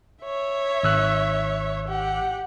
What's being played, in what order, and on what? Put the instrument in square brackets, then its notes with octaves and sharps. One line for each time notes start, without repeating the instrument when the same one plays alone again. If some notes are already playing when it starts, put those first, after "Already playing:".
[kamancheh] C#5 E5
[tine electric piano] G#1 E6 F#6
[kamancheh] G4 F#5